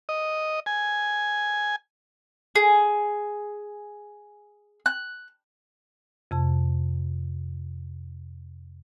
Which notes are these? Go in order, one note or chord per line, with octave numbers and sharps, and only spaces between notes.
D#5
G#5
G#4
F#6
F2 C3 A5